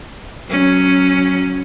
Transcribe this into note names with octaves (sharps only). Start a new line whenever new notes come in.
F#3 C#4